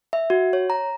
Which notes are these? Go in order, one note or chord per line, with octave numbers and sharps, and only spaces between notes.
E5
F#4
C#5
A#5